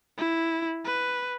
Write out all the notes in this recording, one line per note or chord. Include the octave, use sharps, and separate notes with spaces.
E4
B4